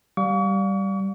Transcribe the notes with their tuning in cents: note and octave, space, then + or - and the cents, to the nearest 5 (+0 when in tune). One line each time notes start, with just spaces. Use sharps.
G3 -10 F5 +25 C#6 +40